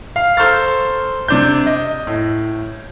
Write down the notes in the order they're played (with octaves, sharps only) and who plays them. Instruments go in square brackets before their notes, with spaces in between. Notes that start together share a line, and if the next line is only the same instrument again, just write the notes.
[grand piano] F5
A4 C5 A#5 C#6 F6 A6
C3 D4 G6
D#5
A2